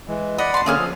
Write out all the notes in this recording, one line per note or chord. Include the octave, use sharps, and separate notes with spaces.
E3 G#3
D5 D#5 F#5 B5
A5 C6
D3 A3 A#3 C#4 G#4 F6
F3